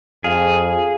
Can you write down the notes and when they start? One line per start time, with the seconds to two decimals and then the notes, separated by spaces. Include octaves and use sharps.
0.24 F2 G#4 F5